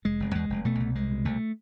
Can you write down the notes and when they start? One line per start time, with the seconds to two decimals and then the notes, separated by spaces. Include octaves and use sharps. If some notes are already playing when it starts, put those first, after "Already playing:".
0.05 F1 G#3
0.20 F1
0.35 E2 G#3
0.50 F1
0.65 B2 A3
0.80 C2
0.95 C2 G#3
1.10 B2
1.25 C2 A3